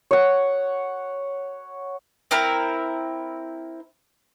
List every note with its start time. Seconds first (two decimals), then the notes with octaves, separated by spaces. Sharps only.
0.11 C#5 F#5
2.31 C4 E4 A#4